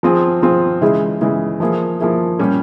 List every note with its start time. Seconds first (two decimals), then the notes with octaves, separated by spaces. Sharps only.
0.03 F3 C4 F4 G#4
0.42 F3 C4 F4 G#4
0.81 C#3 E3 G#3 E4 G#4
1.21 C#3 E3 G#3 E4 G#4
1.60 F3 A#3 E4 G#4
2.00 F3 A#3 E4 G#4
2.39 A#2 G3 C#4 G4